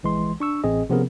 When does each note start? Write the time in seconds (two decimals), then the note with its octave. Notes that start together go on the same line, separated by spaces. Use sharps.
0.03 A#1 E3 G#3 C6
0.40 D4 C#6 E6
0.64 A1 C4 G#4 D#5
0.90 C3 F3 B3 C#4 G#4 A#4